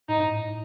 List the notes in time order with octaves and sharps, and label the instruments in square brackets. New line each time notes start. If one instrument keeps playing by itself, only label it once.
[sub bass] A2 [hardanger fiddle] D#4
[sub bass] G#2
A2